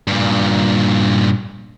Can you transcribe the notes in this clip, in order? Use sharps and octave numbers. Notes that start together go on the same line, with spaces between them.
G2 A#2